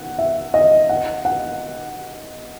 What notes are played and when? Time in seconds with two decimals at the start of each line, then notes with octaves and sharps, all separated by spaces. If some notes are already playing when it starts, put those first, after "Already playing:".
Already playing: F#5
0.19 E5
0.54 D#5
0.89 F#5
1.25 F#5